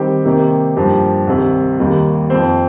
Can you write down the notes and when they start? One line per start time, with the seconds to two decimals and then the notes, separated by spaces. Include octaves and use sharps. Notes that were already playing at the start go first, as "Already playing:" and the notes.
Already playing: D#3 G3 C4 G4
0.25 C3 D#3 A#3 G4
0.76 G2 F3 A#3 G4
1.27 C2 C3 D#3
1.79 D#2 D#3 G3 A#3
2.30 F2 F3 C4